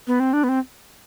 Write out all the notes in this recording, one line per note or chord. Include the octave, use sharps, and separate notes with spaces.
B3
C4
D4
B3
C4